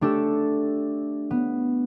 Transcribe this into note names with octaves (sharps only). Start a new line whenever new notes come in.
A3 D4 G4 A4
B3